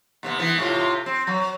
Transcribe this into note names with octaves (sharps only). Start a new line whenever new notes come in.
D#2 C3 B3
E3 B3
A2 C3 F4
C4
F#3